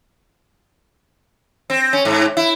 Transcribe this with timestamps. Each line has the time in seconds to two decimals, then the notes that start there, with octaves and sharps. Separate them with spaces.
1.70 C4
1.93 C#4
2.05 G#2
2.37 E4